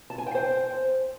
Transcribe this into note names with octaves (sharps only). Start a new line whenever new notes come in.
A5
G#5
G5
C5